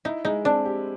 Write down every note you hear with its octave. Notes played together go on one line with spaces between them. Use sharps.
D#4 E4
G#3 D#4
C4 D4
G4